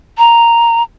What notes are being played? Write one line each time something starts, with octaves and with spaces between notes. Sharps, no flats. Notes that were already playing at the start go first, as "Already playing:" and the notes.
A#5